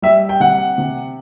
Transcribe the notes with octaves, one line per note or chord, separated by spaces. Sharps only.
G3 E5
G5
C3 F#5
C3